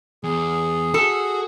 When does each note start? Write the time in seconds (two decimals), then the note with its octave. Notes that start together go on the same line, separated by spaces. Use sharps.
0.24 E2 G#4
0.94 F#4 A4